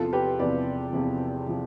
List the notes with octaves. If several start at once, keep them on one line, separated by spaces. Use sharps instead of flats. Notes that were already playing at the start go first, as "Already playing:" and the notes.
Already playing: E2 C3 F3 F4 A4
G4 B4
E2 C3 F3 B4 D5
E2 C3 F3
C3 F3